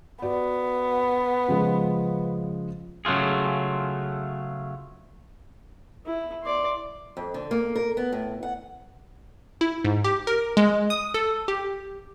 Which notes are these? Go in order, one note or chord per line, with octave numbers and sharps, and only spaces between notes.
B3 F#4 D5
C#3 F3 G#3
C#3 F#3 A3 F4 G#4
E4
D5 C6
F2
D3
A#3
A#4
B3
A2
F#5
E4
G#2
G4
A#4
G#3
D#6
A4
G4